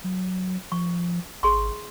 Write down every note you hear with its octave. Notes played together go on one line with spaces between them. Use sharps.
F#3
F3 C#6
G#1 G#4 C6 C#6